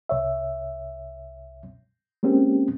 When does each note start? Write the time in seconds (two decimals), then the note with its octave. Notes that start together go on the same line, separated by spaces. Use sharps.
0.09 C2 C#5 E5
2.23 G#3 A#3 C4 C#4 G4